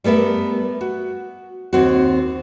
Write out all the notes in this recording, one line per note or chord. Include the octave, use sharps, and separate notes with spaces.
G3 A3 B3 A#4 E5
F#4
D#2 C4 F#4